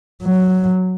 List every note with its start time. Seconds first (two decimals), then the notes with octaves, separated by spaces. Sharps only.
0.23 F#3